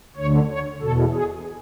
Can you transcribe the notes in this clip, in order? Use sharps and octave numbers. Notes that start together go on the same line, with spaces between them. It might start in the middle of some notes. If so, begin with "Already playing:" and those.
D2 D3 C#5
C#5
E2 B2 A4
G#4